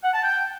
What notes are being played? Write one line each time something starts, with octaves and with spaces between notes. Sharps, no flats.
F#5
A5
G5